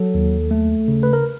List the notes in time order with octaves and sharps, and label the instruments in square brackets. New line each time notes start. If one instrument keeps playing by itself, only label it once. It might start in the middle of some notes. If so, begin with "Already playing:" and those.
Already playing: [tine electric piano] F#3 A4
D#2
A3
C#3
B4
A#4